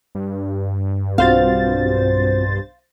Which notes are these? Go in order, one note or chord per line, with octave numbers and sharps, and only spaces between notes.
G2
B1 C4 F4 F#4 C5 F5 A6